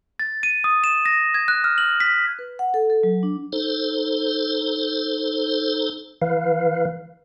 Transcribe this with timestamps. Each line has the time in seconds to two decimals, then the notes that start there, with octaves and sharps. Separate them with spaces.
0.19 A6
0.43 D#7
0.64 D#6
0.84 E7
1.06 A#6
1.34 G#6
1.48 F#6
1.64 F6
1.78 F#7
2.00 B6
2.39 B4
2.59 F#5
2.74 A4
2.90 A4
3.03 F#3
3.23 D4
3.53 D#4 A4 C5
6.22 E3 B4 F5